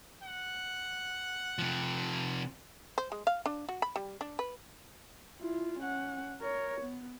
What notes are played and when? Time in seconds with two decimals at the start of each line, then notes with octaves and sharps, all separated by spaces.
0.24 F#5
1.59 C3 F3
2.98 C5
3.12 G#3
3.27 F5
3.46 D4
3.69 F#4
3.82 B5
3.96 G3
4.21 D4
4.39 B4
5.39 E4 F4
5.78 C#4 F#5
6.41 A#4 C#5
6.81 B3